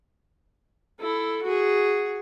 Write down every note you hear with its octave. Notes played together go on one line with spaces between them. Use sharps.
E4 A4
F#4 G#4